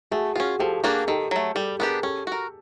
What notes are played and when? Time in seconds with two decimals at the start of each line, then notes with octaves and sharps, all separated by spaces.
0.11 A3 F#4 G#4
0.36 C#4 F4 F#4 G#4
0.60 F3 G4 A4
0.83 A#3 D4 F#4 G#4 A#4
1.08 D#3 G4 A4
1.31 F#3 A3
1.55 G3 G4 A4
1.79 B3 D4 G4 G#4 A#4
2.03 C#4 G4 A4
2.27 F#4 A#4